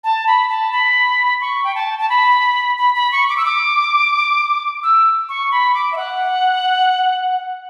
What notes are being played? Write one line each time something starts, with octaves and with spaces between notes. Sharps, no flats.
A5
B5
A5
B5
C#6
G5
A5
A5
B5
B5
B5
C#6
D6
E6
D6
E6
C#6
B5
D6
E5
F#5